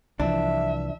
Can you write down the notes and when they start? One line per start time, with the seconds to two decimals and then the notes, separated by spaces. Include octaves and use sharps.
0.20 C2 E3 F3 D4 E5